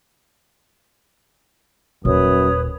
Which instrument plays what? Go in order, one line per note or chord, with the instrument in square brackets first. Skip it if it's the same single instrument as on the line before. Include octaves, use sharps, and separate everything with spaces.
[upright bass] D#1 [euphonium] F#2 [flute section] B4 C#5 D#6